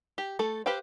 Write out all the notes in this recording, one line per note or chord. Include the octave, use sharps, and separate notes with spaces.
G4
A3 A4
G4 B4 C5 F5 G5